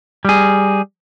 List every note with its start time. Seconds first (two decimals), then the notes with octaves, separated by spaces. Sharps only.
0.25 G3 G#4